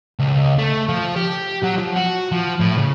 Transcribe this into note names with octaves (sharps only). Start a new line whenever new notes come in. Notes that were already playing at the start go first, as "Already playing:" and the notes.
C#2
A3
F3
G4
F#3
F3
F#4
F3
A2
C#3